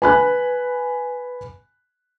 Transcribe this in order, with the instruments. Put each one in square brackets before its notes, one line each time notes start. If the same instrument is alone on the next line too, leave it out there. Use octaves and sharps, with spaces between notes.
[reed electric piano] B4 [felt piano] G#5 B5 F#6